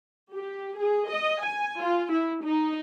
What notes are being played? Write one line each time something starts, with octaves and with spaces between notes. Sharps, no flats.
G4
G#4
D#5
G#5
F4
E4
D#4